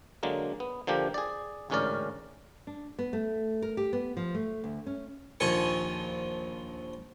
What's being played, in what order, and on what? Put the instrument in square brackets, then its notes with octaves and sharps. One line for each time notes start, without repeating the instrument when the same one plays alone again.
[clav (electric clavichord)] D3 F#3 G#3 A#3
B3
D3 F3 A#3 G4
G#4 D5
A1 D2 G#2 C#4 A#4 D5
[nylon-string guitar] D4
B3
A3
A#4
G4
B3
F3
A3
D2
C#4
[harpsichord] A#1 D#2 F3 G#5 C#6